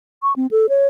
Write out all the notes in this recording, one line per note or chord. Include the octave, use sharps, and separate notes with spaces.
C#6
C4
A4
C#5